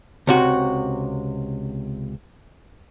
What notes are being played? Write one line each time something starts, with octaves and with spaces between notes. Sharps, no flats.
C#2 C3 F#4